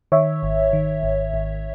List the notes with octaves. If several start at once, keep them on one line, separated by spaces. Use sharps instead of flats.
D#3 C#5 E5
G#1
D#3
G#1
G#1